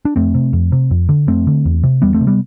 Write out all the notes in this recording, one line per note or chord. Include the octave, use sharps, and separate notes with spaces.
D4
F2 A3 C4
C3
F2
C3
F2
D3
F2 A3 C4
D3
E2
C3
E2 G3 B3
A3 C4
C3
G3 B3